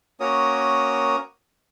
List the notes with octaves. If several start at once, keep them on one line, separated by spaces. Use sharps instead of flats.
A#3 C#4 F#4 A#4 C#5 D#6